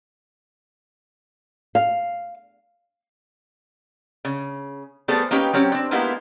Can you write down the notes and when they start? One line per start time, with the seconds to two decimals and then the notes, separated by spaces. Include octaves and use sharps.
1.75 F5
4.25 C#3
5.08 G3 A3 B3 G#4 A4 C5
5.31 A#3 C#4 D#4 G4 B4 G5
5.53 F#3 C4 C#4 G4
5.72 C4 D4
5.91 G#3 A#3 B3 D#4 E4 G4